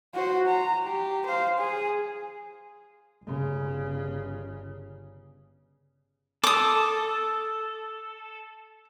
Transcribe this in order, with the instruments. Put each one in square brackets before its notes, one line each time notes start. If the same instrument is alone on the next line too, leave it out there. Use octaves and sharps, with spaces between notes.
[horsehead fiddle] F#4 C5
A#5
G4
C5 F5
G#4
[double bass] G1 C#3
[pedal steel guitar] A4 [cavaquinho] D6 D#6